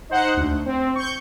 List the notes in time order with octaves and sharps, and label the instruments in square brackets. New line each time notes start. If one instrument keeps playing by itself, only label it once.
[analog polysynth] D#4 C5 F#5
D2
C4
C#6 G6